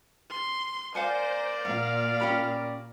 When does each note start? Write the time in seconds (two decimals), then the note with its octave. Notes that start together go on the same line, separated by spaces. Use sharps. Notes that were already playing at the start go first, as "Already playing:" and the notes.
0.30 C6
0.95 A#3 A#4 C5 D5 F5 F#5 G#5
1.65 A#2 F5 F#5
2.20 C#4 G4 B5